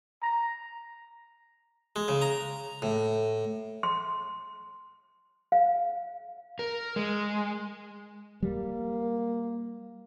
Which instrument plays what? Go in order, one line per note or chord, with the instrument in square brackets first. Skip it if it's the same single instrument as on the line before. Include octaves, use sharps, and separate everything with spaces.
[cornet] A#5
[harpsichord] G#3
C#3
A#5
A2
[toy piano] C6
F5
[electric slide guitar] A#4
G#3
[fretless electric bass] G3 [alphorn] A#3